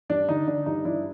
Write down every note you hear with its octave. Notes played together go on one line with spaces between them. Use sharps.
G2 D4
D3 D#4
D3 D4
G2 D#4
G2 D4 E4